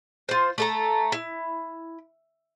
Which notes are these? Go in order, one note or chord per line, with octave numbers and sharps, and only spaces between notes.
F4 C5
A3 A4 A#5
E4